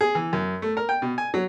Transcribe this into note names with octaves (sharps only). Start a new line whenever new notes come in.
G#4
E3
F#2
A3
A#4
G5
B2
G#5
F#3